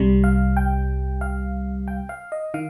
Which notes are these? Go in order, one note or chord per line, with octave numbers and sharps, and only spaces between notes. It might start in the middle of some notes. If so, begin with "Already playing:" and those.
Already playing: C2 C3 G3
F5
G5
F5
G5
F5
D#5
D#3 F5